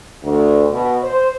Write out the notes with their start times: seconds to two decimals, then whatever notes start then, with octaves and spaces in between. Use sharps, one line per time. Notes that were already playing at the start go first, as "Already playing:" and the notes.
0.24 D2
0.72 B2
1.02 C5